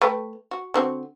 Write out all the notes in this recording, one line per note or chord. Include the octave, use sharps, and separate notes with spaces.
A3 B4 G5
F#4
D3 C4 F#4